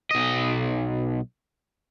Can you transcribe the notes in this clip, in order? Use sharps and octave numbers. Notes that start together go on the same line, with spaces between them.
B1 D#5